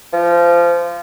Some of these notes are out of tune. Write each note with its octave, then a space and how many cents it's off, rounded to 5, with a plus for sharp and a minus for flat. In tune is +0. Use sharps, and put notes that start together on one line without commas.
F3 -20